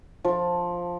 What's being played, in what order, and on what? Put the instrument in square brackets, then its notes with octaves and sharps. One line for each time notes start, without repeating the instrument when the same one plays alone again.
[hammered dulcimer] F3